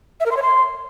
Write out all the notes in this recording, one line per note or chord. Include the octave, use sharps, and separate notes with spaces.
E5
A#4
C6
C#5
C6